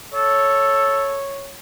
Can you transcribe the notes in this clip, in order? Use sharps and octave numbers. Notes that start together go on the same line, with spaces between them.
A4 C#5